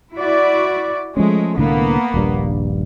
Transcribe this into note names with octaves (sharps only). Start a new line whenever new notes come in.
E4 F#4 D5
F3 G#3 A3 C#4
C2 A2 D3 A#3 B3
D#1 A#1 G2